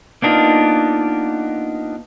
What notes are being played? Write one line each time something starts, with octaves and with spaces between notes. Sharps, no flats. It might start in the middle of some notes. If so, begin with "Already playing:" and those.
A#3 B3 D4 D#4 F4